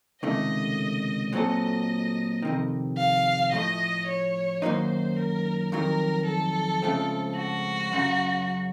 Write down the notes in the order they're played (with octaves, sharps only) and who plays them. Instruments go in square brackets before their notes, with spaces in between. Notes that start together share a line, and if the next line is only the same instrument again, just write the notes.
[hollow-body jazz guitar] C#2 C3 D#3 A3 [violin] D#5
[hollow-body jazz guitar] A#2 F#3 C4 F#4 A4 [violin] D#5
[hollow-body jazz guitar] F2 C3 D#3
[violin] F5
[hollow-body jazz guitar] A2 F3 A3 [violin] D#5
[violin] C#5
[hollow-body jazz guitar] F#2 D#3 F#3 A#3 D#4 [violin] C5
[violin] A#4
[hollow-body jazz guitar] F2 D#3 F#3 [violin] A#4
[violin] A4
[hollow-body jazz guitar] C#2 C#3 F3 A3 C4
[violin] F#4
[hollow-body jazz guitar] F#2 C#3 F#3